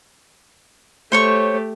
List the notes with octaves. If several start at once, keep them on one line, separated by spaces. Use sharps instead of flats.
A3 G4 C5 C#5 C#6